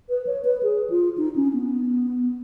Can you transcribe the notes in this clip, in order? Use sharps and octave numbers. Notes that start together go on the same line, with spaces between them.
B4
C#5
B4
G#4
F4
D#4
C#4
B3